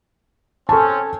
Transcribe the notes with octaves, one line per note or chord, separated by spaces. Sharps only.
C4 C#4 A4 A5